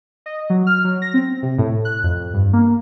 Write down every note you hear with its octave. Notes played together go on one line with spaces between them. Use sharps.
D#5
F#3
F6
F#3
A#6
C4
C3
A2
F#6
F2
G2
A#3